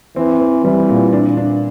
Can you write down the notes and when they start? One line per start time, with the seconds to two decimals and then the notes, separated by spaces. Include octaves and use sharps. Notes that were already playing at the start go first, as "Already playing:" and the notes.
0.16 E3 C4
0.41 C4
0.65 E3 G3
0.89 A#2
1.13 D4
1.37 D4